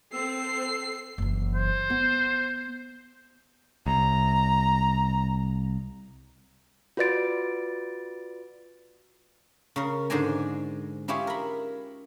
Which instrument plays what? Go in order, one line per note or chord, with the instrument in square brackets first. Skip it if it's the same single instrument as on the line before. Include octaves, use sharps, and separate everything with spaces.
[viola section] C4 A4 [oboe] E6 [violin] C7
[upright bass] F#1 E3
[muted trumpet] C5
[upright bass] B3
[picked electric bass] C2 [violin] A#5
[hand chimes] F4 F#4 B4 D5 A6 D7
[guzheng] C#3 A#4
G#2 D3 C5 D5 D#5 G#5
C#4 E4 F4 G4 G#4 C#5
A#4 B5